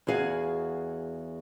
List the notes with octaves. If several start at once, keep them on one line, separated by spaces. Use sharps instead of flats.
E2 F#4 G#4 F5 F#5